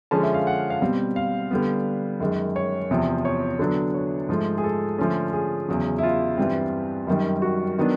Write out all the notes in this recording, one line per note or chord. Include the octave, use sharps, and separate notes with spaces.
D3 F3 G#3 C#4 A5
E5
F5
F#5
F5
B2 G3 C4
F5
D3 G3 B3
F#2 D#3 G#3
C#5
E2 C3 F3
C#5
D3 F#3 B3 D4
C#5
G#2 F3 A3
G#4
A4
D3 F3 A3 C#4
G#4
E2 C#3 F#3
E4
F4
G2 E3 G3 C4
F#2 D#3 G3
F#4
D#3 F#3 B3 D4